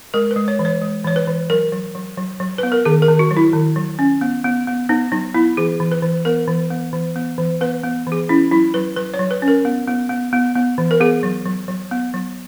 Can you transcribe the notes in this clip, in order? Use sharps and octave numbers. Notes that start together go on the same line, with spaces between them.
G#3 A#4
B4
G#3
C#5
E3
C#5
G#3
E3 C#5
B4
E3
F#3 A#4
F#3
F#3
F#3
F#3
B3 B4
A#4
D#3 G#4
A#4
D#3
F#4
F#3
E4
D#3
F#3
C#4
B3
B3
B3
B3 D#4
F#3 D#4
B3 E4
E3 G#4
E3
B4
E3
B3 A#4
E3
B3
E3
B3
E3
B3 B4
B3
E3
G#4
C#4 E4
F#3 E4
F#3 B4
F#3 B4
C#5
F#3
B4
C#4
A#4
B3
B3
B3
B3
B3
E3
A#4
B3 G#4
F#3
F#3
F#3
B3
F#3